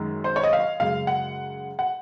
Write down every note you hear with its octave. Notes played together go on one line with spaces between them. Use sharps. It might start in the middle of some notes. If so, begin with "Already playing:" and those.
Already playing: F#2 D#3 G#3
C5
C#5
D#5
F5
F#2 C#3 G#3 F5
F#5
F#5